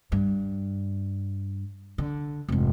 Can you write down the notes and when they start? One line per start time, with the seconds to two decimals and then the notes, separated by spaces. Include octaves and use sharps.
0.12 G2
1.98 D3
2.48 F1 G#2